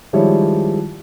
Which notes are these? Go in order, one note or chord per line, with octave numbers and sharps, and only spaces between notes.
D#3 F3 G3 G#3 E4 C#5